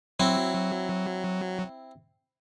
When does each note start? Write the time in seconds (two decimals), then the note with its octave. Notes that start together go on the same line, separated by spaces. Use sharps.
0.20 F#3 C4 E4